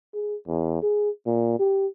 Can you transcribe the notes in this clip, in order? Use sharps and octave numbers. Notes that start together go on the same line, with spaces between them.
G#4
E2
G#4
A#2
G4